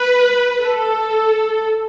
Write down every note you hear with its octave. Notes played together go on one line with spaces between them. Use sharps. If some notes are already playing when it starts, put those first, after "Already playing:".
Already playing: B4
A4